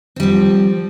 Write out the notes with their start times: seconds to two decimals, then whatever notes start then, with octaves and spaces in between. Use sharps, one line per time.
0.16 C4
0.20 G3
0.23 F3